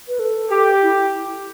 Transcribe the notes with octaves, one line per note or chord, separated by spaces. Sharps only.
B4
A4
G4
E4